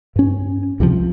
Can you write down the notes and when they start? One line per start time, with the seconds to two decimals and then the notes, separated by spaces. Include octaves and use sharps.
0.16 G2 C#4
0.80 C#2 C3 D#3 F3